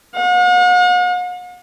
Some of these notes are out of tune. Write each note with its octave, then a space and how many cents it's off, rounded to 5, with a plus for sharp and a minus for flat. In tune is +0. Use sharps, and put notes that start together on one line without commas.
F#5 -45